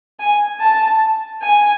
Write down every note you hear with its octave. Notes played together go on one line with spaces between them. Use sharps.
G#5
A5
G#5